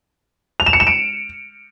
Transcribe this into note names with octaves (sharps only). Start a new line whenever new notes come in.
F7
E7
C#7
E7
D7